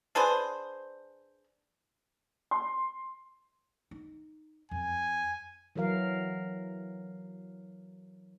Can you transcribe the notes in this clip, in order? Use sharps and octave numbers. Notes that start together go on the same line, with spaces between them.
D4 G#4 B4 C5
C6
D#4
F2 G#5
E3 F#3 A#4 F5